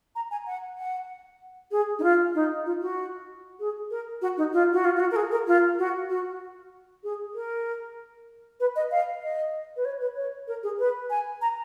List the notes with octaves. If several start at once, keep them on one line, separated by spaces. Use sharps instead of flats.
A#5
G#5
F#5
F#5
G#4
D#4
F4
D#4
F4
F#4
G#4
A#4
F#4
D#4
F4
F#4
F4
F4
F#4
A#4
G#4
A#4
F4
F#4
F#4
G#4
A#4
B4
D#5
F5
D#5
B4
C#5
B4
C#5
A#4
G#4
B4
G#5
A#5